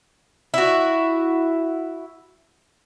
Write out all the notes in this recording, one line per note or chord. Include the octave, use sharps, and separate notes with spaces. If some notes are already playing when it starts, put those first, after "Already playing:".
E4 F#4